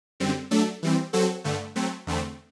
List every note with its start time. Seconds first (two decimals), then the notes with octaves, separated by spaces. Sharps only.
0.20 F#2 D3 G3 C4
0.51 F#3 A3 D4 A4
0.82 E3 G3 C4
1.13 F#3 C4 F#4 A4
1.44 G2 D3 A3
1.76 F#3 A3 C4
2.07 E2 D3 A3 C4